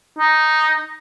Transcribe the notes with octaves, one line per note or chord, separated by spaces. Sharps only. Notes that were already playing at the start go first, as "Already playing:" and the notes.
D#4